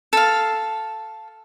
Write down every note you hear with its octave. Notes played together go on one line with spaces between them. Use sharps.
A4 F5